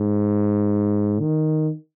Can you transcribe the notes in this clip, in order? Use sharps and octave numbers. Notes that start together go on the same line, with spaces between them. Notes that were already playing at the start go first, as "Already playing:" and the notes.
Already playing: G#2
D#3